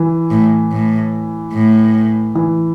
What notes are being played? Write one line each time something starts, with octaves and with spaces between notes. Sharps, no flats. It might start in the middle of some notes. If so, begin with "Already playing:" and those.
Already playing: E3
A2
A2
A2
E3